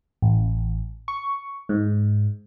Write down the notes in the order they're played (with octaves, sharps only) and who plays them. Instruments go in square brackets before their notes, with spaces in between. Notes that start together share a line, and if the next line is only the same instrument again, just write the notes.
[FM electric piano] A1
C#6
G#2